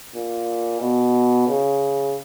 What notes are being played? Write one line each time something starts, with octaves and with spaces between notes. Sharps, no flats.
A#2
B2
C#3